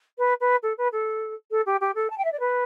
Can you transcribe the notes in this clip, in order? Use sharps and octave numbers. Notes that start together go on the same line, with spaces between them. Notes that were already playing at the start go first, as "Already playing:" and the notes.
B4
B4
A4
B4
A4
A4
G4
G4
A4
A5
G5
E5
D5
B4